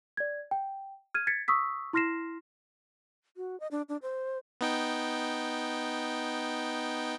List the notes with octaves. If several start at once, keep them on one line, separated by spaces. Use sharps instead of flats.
D5 G#6
G5
F6 G#6 D#7
G#6 A6 B6 C#7
C#6 D#6 E6 B6
E4 C6 F6 A#6 C7 E7
F#4
D#5
D4
D4
C5
B3 D#4 G5